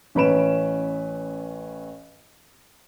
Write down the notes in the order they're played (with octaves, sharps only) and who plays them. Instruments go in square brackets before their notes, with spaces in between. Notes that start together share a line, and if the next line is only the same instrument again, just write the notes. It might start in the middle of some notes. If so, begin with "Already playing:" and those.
[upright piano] A1 C#4 B4 B5 D7 E7